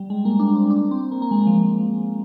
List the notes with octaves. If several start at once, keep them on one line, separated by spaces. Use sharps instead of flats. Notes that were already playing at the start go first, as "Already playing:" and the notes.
Already playing: G3
G#3
A#3
D4
C4
D4
C4
A#3
A#3
G#3
F3